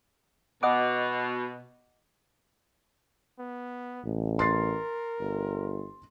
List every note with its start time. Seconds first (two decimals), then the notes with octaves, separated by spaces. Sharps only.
0.63 B2 D#5 F#5 D6
3.39 B3
4.04 A1
4.39 A#4 C6 A6 C7
5.20 G1